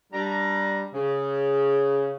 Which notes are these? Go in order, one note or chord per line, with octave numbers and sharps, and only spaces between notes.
G3 D4 A#5
C#3